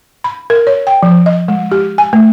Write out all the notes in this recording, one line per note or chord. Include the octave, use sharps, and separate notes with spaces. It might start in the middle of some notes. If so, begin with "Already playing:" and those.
B5
A#4
C#5
G5
F3
D#5
G#3
G4
G#5
A3